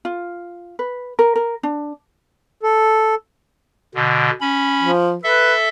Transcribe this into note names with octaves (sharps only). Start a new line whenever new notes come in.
F4
B4
A#4
A#4
D4
A4
B2 D3
C#4 B5
F3
A4 B4 E5